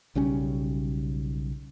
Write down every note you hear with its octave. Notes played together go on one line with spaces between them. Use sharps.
B1 C#3 G3 C#4